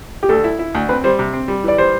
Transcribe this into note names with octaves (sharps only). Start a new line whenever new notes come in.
G4
D2 A4
E4
E4
D2
C4 B4
G3 C5
C3
C4
G3
E3 D5
G3 C5